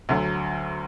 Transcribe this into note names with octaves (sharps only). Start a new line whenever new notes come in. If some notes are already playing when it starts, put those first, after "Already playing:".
D2 D3 F#3